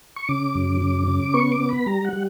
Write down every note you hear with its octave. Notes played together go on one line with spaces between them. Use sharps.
C#6
C#3 D6
F#2
C#3
C#3
B3 C#6
D6
B3
B5
G3 A#5
F#5
G3